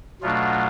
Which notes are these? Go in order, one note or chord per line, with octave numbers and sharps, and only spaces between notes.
B2 F#3 A3 D4 F4